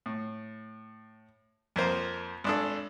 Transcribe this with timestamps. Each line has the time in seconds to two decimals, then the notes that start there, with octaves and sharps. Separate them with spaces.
0.06 A2
1.76 F2 A#3 C5
2.44 G#1 D4 A4